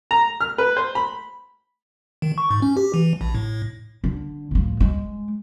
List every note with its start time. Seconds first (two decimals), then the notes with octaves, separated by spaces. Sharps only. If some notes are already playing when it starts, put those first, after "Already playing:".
0.11 A#5
0.41 F6
0.58 B4
0.77 C5
0.95 B5
2.22 D#3
2.38 C#6
2.51 G#2
2.62 C#4
2.77 G4
2.94 E3
3.21 A#1
3.35 A2
4.04 D3
4.51 A2 F3
4.80 G#3